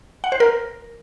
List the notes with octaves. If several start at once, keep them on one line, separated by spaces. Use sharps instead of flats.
F#5
C5
A#4